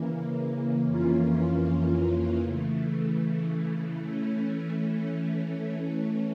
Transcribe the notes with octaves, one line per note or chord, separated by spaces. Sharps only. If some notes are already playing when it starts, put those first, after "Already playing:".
Already playing: C#3 E3 A#3
F2 E3 A#3 C#4 F4
C#3 E3 A3
E3 A3 C#4